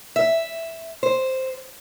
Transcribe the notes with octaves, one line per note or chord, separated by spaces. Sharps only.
E5
C5